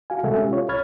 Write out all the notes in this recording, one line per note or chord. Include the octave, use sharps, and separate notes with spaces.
F#4 F5 G#5
C3 G#3 F#4 A4 E5 G#5
C#4 G4
F4 C#5
C2 C#5 B5 F6 G#6 A6